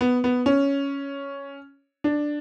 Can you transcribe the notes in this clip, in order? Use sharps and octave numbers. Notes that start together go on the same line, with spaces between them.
B3
B3
C#4
D4